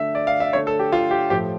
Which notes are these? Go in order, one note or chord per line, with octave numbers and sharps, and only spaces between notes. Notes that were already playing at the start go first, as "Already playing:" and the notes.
Already playing: D3 A3 E5
D5
F5
E5
D3 A3 C#5
A4
G4
F4
G4
A2 F3 A3 G4